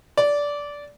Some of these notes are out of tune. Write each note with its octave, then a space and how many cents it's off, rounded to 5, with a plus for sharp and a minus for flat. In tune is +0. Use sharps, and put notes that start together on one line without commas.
D5 -15